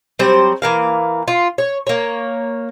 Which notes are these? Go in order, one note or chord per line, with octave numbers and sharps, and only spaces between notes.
F#3 G3 C4 C5
E3 A#3 F5
F4
C#5
A#3 C#5